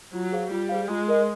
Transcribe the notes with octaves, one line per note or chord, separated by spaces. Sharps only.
F#3 F4
G#4 C5 F5
G3 F4
G#4 C5 F5
G#3 F4
A#4 D#5